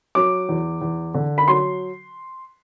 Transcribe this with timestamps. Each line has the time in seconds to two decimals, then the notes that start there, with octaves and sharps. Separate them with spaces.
0.15 F#3 D6
0.49 E2
0.81 E2
1.14 D3
1.38 B5
1.48 F#3 C6